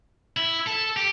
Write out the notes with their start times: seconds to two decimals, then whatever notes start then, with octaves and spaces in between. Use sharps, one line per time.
0.37 E4
0.67 A4
0.97 G4